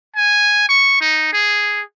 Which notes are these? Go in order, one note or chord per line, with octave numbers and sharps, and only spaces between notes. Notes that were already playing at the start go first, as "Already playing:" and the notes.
G#5
C#6
D#4
G#4